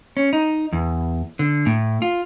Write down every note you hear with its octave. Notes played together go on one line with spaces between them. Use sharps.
C#4
D#4
E2
D3
A2
F4